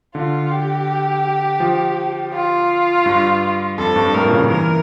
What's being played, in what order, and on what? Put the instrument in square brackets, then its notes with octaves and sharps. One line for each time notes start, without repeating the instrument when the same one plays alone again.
[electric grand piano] D3 [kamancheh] F4
[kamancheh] G4
[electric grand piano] F3
[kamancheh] F4
[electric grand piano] G2
[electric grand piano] F2 [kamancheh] A4
[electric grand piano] G2
[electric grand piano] A2 [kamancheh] A#4
[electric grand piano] A#2
C#3
[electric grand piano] E3 [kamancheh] A#4